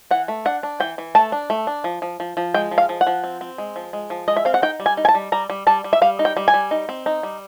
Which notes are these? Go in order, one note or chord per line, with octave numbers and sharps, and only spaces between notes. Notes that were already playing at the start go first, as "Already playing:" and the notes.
E3 F#5
A3
D4 F#5
D4
E3 G5
E3
A3 A5
D4
A3
D4
F3
F3
F3
F3
G#3 G5
F3
F5
F3
F#5
F3
C4
C4
G#3
F3
G#3
F3
G#3 D#5
E5
C4 F5
F#5
D#4 G5
G3
G#5
D#4
G#5
A5
G3
G3 A#5
G3
G3 A5
G3
E5
G3 F5
D#4
G5
G3
G#5
G3
D#4
C4
D#4
G3